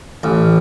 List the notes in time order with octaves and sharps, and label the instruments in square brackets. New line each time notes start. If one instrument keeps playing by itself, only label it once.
[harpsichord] A1